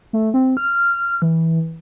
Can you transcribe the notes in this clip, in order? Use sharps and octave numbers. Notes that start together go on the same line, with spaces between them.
A3
C4
F6
E3